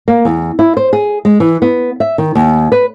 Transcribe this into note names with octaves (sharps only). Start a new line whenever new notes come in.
A#3
E2
E4
C5
G#4
G#3
E3
B3
E5
D#3
D#2
B4